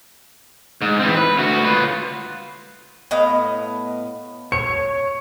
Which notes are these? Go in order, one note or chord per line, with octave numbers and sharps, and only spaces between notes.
G#2
E3 C4
B4
D2 F#4
F4 B4
A2 B3 D#5 F5
C#5 C#7